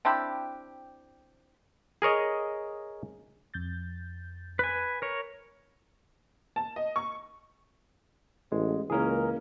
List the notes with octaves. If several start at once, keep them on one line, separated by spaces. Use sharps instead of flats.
C4 D4 E4 G4
G#4 A#4 C#5 D#5
F2 G6 A6
B4 G#5
A#4 C#5
A5
D#5
C#6
A1 G#3
C#2 E3 A#3 C#4 G#4 A#4